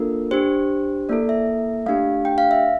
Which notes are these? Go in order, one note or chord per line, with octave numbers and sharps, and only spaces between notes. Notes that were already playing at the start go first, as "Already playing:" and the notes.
Already playing: A#3 D4 F4 A4 A#4
D4 G4 C5
A#3 E4 A4 D5
E5
A3 D4 G4 F5
G5
F5
E5